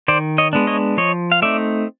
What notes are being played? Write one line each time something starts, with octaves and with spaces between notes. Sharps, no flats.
D#3 C5 D5
C#5 D#5
G#3 B3 D4
C#5 D#5
F3 C#5 D#5
F5
A3 C4 D#4 D5 E5